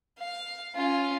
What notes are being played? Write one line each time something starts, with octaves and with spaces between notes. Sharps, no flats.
F5
C#4 F4